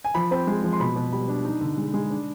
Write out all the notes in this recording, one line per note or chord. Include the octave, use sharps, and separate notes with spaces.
G#5
F3 B5
C4 B5
G#3
F3
C6
B2 B5
B2
G3 B5
D4
D#4
D3
G#3
G#3
D4